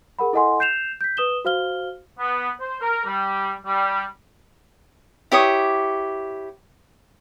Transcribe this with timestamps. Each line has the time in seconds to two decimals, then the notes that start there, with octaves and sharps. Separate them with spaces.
0.19 G#4 A#4 F#5 B5
0.33 E4 A4 D#5 F#5 G#5 C6
0.60 G6 C7 E7 F7
1.01 G6 B6
1.17 B4 D#6 E7 G7
1.45 F#4 C5 F5 F6 G7
2.19 B3
2.61 C5
2.82 A#4
3.06 G3
3.67 G3
5.32 E4 G4 C#5 D#6